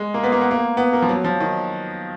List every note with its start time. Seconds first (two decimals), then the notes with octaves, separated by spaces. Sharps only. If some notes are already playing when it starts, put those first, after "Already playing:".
Already playing: G#3
0.14 A#3
0.24 B3
0.32 A#3
0.41 B3
0.51 A#3
0.77 B3
0.93 A#3
1.02 F3
1.09 F#3
1.25 F3
1.40 D#3